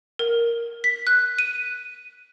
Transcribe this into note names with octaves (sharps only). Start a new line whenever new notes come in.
A#4
B6
F#6
D#7